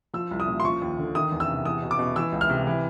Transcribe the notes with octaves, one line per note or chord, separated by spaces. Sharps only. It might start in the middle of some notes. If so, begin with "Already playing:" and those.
F3 E6
C2
D#6
A#2
C6
F3 C#6
D#2
D3
D#3 D#6
E2
E6
C3
E2 D#6
B2
D6
B2
E3 E6
C#2
F6
C3
E3